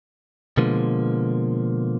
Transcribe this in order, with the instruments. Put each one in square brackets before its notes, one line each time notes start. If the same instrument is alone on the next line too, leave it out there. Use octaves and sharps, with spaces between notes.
[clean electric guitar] B2 D3 F3 G#3 A#3